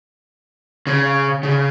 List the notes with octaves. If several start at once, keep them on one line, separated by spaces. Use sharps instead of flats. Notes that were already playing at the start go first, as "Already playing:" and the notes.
C#3
C#3